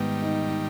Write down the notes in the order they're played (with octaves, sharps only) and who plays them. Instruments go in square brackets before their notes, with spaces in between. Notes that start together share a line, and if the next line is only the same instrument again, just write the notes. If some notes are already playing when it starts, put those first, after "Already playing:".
Already playing: [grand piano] G#2 B3 [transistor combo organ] D#3 G3
[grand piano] D#4
D#4